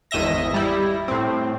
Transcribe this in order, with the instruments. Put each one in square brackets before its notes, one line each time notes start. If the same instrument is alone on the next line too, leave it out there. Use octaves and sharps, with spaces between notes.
[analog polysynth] G#1 E2 D#5 E5 A#6
G3 E4
A2 C4